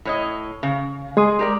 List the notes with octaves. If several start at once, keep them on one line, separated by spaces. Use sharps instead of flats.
A2 C#5 D#5
C#3
G#3 G#4 C6 D#6
G4 A#4 D5